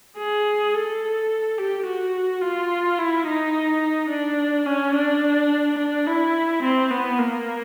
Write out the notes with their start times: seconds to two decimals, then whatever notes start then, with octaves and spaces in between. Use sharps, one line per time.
0.18 G#4
0.74 A4
1.58 G4
1.86 F#4
2.42 F4
2.98 E4
3.26 D#4
4.10 D4
4.66 C#4
4.95 D4
5.78 D4
6.07 E4
6.62 C4
6.90 B3
7.18 A#3